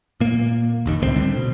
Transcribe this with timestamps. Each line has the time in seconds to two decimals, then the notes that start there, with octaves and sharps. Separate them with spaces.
0.20 A#2 A#3
0.86 F1 D#2 D#3
1.00 C#2 A2 G#3 C4
1.16 D3 G3 C4
1.36 B2